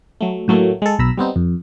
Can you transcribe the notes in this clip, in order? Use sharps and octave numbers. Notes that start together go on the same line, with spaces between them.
F#3 A3
A2 F#3 A3 A#3
G#3 A4
B1 B2 A#5 B5 E6
G3 B3 C4 D#4
F2